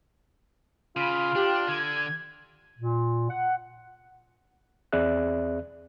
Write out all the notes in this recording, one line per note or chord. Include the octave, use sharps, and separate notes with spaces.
C#3 F4 B5
D4 G4
D3 G#6
A#2
F#5
E2 C4 G#4 D5 E5 F#6